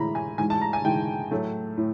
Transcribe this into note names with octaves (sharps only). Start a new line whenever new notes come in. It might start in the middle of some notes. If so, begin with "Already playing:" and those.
Already playing: A2 E3 G#3 A#5 B5
G#5
G#2 E3 G#3 G#5
A5
A#5
G#5
G#2 E3 G#3 G5
A2 F#3 A3
A2